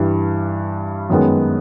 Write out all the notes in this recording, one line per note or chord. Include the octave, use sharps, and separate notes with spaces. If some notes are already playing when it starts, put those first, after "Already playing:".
Already playing: G2 E3 G3
F#2 D#3 G#3 B3